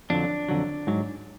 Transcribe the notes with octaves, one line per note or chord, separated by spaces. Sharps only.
F2 D3 F#3 D4
F2 D3 F#3
G#2 F#3